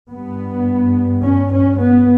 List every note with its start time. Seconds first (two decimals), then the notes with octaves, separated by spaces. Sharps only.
0.11 G2 B3
1.24 C#4
1.52 C#4
1.80 B3